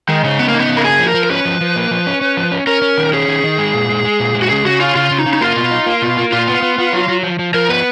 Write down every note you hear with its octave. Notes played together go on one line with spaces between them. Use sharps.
D#3 G#3
C#3 D#4
C#3 B3
A#3
D#4
B3
C#3
A#4
A#3 G#4
F3
A#4
F3
A#4
C#4 B4
F3
F3
A#3
F3
C#4
C#4
F3
C#4
C#4 A#4
C#4
D#3
C#4 G#4
D#3
D#3
G#3
A#2
G#3
G#3
A#2
G#3
F#4
C#3 G#4
C#3 F#4
C#4 F4
C#3 F4
C#3
D#4
C#3
D#4
A#3 F4
B2
D#4
A#3
B2
A#3
A#2 F4
B3
B3
B3
F#3
F#3
F3
F3
F3 A#4
B3 B4